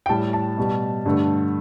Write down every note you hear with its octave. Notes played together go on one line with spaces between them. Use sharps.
G5
A2 G3 A5
A5
B2 G3
G2 D3 A3